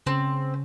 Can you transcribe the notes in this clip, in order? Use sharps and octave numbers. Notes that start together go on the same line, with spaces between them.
C#3 C4 C#4